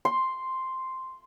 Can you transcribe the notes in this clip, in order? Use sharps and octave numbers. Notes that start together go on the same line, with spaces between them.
C6